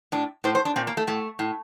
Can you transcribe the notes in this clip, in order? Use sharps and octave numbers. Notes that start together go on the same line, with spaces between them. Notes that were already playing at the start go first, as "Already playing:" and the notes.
A2 D4
A2 C5
C5
D4
A#2 C4
A#3
A3
A2 A3
A2